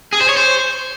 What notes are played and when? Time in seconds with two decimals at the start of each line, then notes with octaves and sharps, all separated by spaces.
0.13 G#4
0.21 C5
0.29 C#5
0.37 C5